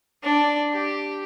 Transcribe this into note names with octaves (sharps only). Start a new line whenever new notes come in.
D4
G4